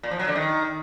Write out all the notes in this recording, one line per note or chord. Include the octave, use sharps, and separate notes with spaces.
A#2
F3
F#3
D3
D#3